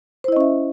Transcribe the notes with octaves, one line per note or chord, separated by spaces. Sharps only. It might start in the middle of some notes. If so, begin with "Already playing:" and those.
C#4 E4 C5 D#5 E5